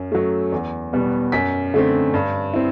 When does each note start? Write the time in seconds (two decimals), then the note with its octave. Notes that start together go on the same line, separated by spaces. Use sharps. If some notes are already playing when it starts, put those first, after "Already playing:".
Already playing: F#2
0.12 F#3 A3
0.52 E2
0.93 B2 G3 B3
1.32 F#2 B6
1.74 D3 A3 C4
2.14 G2
2.53 C4 E4